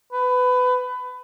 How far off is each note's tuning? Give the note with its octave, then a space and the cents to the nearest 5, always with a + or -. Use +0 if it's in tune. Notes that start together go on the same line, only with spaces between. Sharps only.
B4 +20